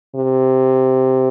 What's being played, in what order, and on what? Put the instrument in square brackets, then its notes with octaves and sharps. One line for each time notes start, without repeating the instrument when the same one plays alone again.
[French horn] C3